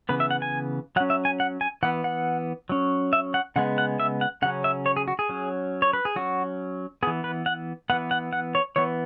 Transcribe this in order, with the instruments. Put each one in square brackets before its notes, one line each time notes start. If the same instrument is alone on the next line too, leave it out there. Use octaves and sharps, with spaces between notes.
[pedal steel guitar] C#3 E3 B3 B4
E5
F#5
G#5
F#3 F#5
C#4
E5
G#5
F#5
G#5
E3 B3 F#5
F#5
F#3 C#4
E5
F#5
C#3 G#3 B3 F#5
F#5
E5
F#5
C#3 F#3 C#4 F#5
E5
C#5
G#4
F#4
G#4
F#3 C#4
C#5
B4
G#4
F#3 C#4 F#4
B3 G#4
E3
B4
F#5
E3 B3 F#5
F#5
F#5
C#5
E3 B3 C#5